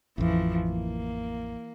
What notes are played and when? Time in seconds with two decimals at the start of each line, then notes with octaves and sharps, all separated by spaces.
0.18 A1 F2 E3 F3
0.71 A#3